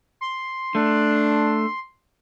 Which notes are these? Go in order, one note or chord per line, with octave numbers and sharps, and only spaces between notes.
C6
A3 D4